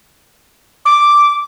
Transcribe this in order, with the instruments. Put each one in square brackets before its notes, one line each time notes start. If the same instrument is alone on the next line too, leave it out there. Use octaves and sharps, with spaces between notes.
[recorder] D6